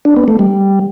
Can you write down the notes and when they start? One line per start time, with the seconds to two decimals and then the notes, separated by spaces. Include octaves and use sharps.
0.05 D4
0.16 B3
0.28 A3
0.39 G3